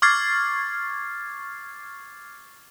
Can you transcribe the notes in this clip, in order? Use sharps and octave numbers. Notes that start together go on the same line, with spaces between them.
C#6 D6 F6 G#6 A6 C7